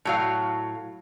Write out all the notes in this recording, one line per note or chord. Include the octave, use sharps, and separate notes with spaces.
A2 F#3 F5